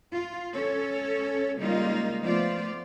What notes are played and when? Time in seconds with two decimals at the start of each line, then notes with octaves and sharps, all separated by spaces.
0.12 F4
0.53 C#4 A4 C#5
1.57 C#3 G3 G#3 A#3 D#4 F4
2.22 F3 A3 B3 F4 C5 D5